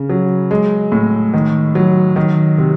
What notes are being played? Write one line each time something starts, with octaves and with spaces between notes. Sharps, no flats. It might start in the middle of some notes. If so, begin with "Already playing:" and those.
Already playing: C#3
F#3
G#3
A2
D#3
F#3
D#3
C3